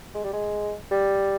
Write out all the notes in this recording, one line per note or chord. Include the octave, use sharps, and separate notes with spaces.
G#3
G3
G#3
G3